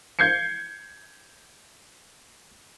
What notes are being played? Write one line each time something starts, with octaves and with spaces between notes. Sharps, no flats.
G6 G#6 C7 C#7